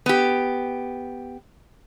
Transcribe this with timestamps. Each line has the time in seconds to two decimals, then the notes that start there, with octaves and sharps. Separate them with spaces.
0.06 B3 G4